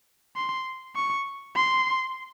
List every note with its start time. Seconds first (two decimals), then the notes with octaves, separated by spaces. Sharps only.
0.36 C6
0.95 C#6
1.56 C6